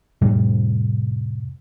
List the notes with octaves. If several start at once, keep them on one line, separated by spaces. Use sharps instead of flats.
F2 A2 C3 G3